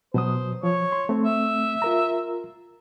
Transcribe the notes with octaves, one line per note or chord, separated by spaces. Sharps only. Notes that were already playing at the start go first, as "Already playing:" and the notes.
B2 F#3 C5 D#6
F3 C#5
C6
A3 C4
E5
F4 A#4 A#5